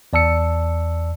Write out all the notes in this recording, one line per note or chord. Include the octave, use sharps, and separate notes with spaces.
E2 D5 A5 E6 C#7